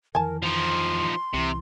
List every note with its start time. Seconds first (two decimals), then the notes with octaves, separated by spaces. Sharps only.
0.15 F2 D#3 E3 A#4 G#5 A5
0.43 F3 D#4 C6
1.34 C2 C3 E3